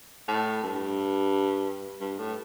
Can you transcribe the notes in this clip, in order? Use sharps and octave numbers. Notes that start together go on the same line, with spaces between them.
A2
G2
G2
A2